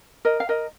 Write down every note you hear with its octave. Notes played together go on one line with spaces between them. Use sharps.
A#4 D#5
F5
A#4 D#5